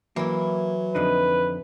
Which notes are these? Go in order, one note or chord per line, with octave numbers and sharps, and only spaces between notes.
E3 F#3 A#3 E4
F2 D3 D#4 B4